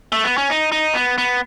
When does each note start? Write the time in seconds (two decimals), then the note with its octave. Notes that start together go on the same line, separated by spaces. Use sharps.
0.12 A3
0.24 B3
0.38 C#4
0.50 D#4
0.72 D#4
0.95 B3
1.18 B3